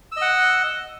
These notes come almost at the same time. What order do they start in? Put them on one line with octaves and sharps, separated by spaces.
E6 D#5 F#5